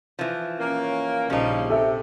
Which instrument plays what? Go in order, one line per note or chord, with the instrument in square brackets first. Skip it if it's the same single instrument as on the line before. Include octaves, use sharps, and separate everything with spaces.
[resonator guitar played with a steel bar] E3 F3
[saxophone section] A#3 A#4 [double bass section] C#4
[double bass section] A#1 A#2 [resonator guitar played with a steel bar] C#3 D#4 [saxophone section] F3 G3
[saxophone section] C3 [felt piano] G4 A4 E5